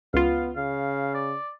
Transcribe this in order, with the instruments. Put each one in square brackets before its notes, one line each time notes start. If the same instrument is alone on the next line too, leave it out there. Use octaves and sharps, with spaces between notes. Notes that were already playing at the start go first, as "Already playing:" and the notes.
[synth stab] C#2 F4 [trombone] B3 [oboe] F5
[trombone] C#3 [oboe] F5
[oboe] D5